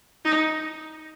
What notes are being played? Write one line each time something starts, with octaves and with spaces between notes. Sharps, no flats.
D#4